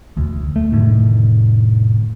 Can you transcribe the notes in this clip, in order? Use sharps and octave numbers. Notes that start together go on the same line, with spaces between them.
E1 D2
A3
F1 A2 D3 D#3